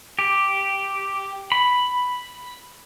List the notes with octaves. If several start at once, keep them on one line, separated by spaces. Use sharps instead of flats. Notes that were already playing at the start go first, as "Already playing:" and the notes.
G4
B5